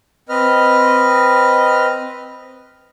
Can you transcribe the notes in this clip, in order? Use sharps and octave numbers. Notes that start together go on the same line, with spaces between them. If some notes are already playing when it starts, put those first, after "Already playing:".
C4 B4 D#5 F6